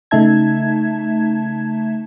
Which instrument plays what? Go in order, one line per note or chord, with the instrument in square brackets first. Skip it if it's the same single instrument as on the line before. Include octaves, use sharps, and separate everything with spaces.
[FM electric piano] C#3 A3 D#4 E5 A5 G#6